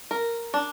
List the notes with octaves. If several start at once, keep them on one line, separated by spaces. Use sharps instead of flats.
A#4
D4